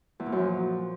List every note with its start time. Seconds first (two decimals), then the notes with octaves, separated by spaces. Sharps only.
0.20 E2
0.26 A#2
0.32 F#2
0.39 F3